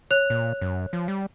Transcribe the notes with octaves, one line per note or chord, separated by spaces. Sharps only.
C#5 F#6 F7
A#2
F#2
F3
G3